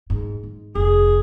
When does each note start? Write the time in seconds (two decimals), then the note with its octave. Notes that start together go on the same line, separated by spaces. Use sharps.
0.10 G#2
0.43 G#2
0.75 F1 G#4